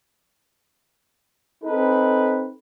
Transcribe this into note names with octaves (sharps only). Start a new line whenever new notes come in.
C4 D#4 A4 B4